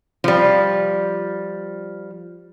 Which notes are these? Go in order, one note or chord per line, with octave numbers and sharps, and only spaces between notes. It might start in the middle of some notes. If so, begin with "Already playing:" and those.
F3 G3